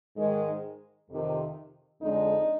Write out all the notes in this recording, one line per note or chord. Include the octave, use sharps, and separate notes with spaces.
G#2 D#3 G#3
F2 C3 D#3
F2 D3 G#3 D#4